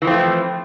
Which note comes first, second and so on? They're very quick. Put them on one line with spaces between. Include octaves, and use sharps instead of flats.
E3 F3 C4 A3